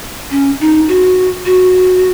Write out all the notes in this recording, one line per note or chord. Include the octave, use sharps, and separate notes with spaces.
C#4
D#4
F#4
F#4